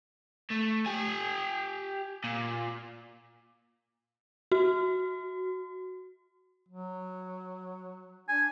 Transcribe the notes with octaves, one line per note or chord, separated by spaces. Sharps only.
A3
G4 G#5
A#2
F#4
F#3
D4 G#5